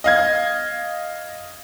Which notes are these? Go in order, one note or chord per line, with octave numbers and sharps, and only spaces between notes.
D#5 F5 G#6